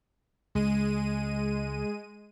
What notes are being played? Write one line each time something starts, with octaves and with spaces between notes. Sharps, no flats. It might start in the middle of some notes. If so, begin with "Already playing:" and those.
C#2 G#3 D#7